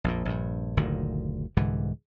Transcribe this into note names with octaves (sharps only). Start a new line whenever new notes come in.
A#1 F2 A#2
A#1 G2
F#1 D2 A#2 D#3
C2 G#2 D3 E3